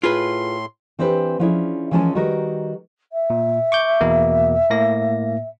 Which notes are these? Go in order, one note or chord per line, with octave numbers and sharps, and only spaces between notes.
A2 F4 G#4 B4 C6
E3 C4 D4 G4 B4
F3 B3 C#4 D4 E4 G#4
E3 F3 G#3 C#4 A#4 A5
D#3 G3 F#4 A#4 B4 D#5
E5
A#2
C#6 D6 G6
E2 B2 A#3
A2 A#3 A#6